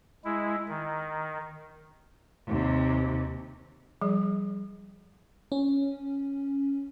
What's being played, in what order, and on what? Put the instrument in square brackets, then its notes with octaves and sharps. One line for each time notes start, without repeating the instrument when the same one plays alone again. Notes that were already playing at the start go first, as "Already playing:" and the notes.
[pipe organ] G#3 E4
D#3
[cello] D#2 C3
[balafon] F3 G3 G#4
[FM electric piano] C#4